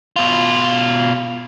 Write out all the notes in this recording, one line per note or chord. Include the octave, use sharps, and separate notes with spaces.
B2 F4